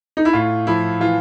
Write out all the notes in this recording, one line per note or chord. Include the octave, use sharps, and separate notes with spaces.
D#4
E4
A2 F4
F3 E4
E3 F4